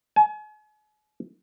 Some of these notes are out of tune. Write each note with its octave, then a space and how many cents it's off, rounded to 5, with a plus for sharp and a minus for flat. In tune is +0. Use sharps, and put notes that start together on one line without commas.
G#5 +40